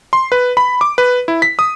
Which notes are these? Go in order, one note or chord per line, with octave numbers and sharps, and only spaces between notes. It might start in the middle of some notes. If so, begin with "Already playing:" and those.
C6
B4
B5
D6
B4
E4
B6
D#6